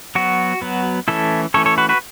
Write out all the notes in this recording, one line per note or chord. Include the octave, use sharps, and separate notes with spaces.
F#3 B3 F#4
F#3 B3
E3 A3 C#4 E4 A4
E3 A3 C#4 A4 C#5
A4 C#5
F#4 B4
F#4 B4